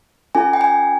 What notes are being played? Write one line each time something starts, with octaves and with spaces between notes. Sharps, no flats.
C#4 F4 A4 G#5
G5
G#5